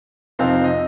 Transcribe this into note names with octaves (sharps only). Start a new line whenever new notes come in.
F2 C3 F3 C4 D#4 F5
D#5